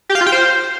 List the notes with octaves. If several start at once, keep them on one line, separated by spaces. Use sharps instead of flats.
G4
F5
F4
G5
C5